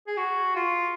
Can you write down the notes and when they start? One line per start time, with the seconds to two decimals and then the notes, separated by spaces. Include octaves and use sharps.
0.07 G#4
0.17 F#4
0.56 F4